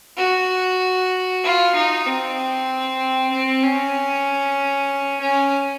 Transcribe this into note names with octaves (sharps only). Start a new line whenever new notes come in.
F#4
F4
D#4
C4
C4
C#4
C#4